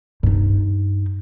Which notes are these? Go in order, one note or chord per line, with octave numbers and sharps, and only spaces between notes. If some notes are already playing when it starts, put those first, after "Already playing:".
G2 D#4